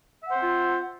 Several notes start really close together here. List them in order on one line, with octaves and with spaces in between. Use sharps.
E5 F#5 C5 C4 F4